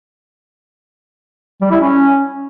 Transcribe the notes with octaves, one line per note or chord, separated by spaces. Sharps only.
G3
E4
C#4